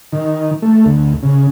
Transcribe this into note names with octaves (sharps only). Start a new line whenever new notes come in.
D#3
A3
D2
C#3